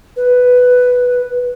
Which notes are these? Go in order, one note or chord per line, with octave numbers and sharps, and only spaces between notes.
B4